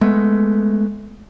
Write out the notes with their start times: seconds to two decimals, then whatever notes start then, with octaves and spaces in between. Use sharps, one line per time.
0.01 G#3 A3 B3